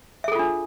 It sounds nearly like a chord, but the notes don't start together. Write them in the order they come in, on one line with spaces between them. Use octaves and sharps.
E5 G#4 A4 F4 D4